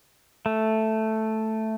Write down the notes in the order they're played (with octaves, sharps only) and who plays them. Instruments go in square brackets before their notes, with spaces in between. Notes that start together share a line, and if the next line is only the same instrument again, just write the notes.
[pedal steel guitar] A3